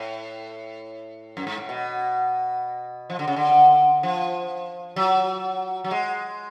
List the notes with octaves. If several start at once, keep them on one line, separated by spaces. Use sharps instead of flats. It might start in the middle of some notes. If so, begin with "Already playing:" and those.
Already playing: A2
F#2
G#2
A2
B2
F3
D3
C#3
D3
F3
F#3
F#3
G#3